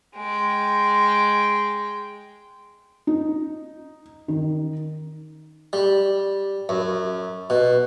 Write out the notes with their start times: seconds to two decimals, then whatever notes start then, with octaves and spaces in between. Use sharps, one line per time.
0.16 G#3 G5
3.07 D#4
4.28 D#3
5.73 G3
6.69 F#2
7.50 B2